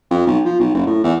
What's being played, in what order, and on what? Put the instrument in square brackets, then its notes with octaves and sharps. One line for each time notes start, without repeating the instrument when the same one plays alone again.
[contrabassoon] F2
B1
F3
B1
F#1
A2
E2